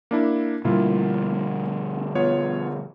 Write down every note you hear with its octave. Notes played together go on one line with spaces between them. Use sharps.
A#3 D4 E4
B2 D3 G3 A#3 E4 F4
B3 F4 C#5